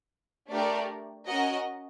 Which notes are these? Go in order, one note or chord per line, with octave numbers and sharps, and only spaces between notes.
A3 D4 G4 A#4 D5
C#4 F#4 A#4 D#5